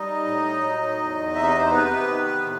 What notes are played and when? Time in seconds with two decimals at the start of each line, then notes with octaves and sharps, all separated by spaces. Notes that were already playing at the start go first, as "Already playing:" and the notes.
Already playing: G3 D#4 D#5
0.25 A2
0.61 F#3
0.98 E2
1.34 C3 E5
1.47 D#5
1.58 C5
1.70 C3 B3 B4
2.08 D#3
2.44 A2